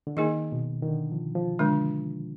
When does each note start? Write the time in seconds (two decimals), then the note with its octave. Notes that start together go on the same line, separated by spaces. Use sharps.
0.07 D3
0.17 D#3 A#3 D#4 G#4 D#5
0.52 B2
0.82 D#3
0.88 D3
1.12 F3
1.35 F3
1.59 D3 G#3 D4